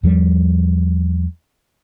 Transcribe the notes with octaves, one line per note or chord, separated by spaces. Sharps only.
E2 F3 G3